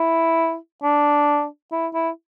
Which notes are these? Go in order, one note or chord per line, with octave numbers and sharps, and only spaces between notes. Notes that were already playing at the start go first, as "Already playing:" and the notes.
Already playing: E4
D4
E4
E4